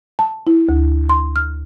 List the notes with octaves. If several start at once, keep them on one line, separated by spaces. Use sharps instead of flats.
A5
E4
D2
C6
F6